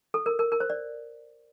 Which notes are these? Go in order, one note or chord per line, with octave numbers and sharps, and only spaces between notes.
A4
A#4
A#4
A#4
C5
D5